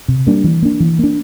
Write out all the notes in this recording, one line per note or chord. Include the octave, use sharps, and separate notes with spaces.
C3
G3 A#3 D4
E3
A#3 D4
E3
A#3 D4